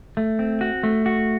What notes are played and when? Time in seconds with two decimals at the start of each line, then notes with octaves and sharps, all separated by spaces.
0.17 A3
0.39 C4
0.61 F#4
0.83 A3
1.06 F#4